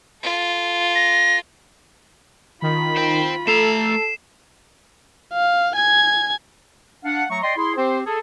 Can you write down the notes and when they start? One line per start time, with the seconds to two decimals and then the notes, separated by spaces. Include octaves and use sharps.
0.23 F4 A4
0.95 A#6
2.62 D#3 F4 B5
2.96 C5 G5
3.47 A3 A4 A#5 C7 E7
5.33 F5
5.76 G#5 G#6
7.04 D4 F5 F#5
7.30 F#3 A3 A#5 C#6
7.42 D5 D#5 G5 C6
7.57 E4 G#4 C6
7.77 C4 G4 C5
8.06 G#4 A4